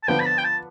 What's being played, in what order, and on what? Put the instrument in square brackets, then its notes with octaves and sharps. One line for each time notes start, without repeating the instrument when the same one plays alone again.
[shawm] A5
[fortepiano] D3 F3 B3 [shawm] G5
[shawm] B5
A5
G5
A5